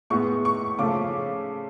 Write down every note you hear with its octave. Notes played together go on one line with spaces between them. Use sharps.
A2 G#3 B3 C#6
C#6
C#3 F3 A3 D6